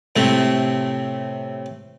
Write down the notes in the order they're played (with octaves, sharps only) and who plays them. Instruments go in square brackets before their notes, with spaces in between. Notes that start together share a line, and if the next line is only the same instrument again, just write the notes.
[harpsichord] A2 C3 A3